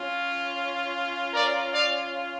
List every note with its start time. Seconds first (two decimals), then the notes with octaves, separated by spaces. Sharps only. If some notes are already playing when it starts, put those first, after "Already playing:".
Already playing: C#4 F4
1.33 A#4 D5
1.73 D5 F5